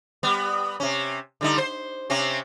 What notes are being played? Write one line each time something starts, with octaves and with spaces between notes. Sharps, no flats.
G3 B3
C3 C#4
D3 G3 D#4
C5
C3 C4 C#4